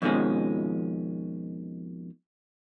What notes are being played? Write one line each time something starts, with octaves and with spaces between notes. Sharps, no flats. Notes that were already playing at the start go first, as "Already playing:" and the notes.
F2 B2 D#3 F3 G#3 C#4